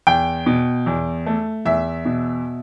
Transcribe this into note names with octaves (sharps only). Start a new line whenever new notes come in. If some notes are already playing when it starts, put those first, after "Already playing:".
E2 G5
B2
E2
A3
E2 E5
B2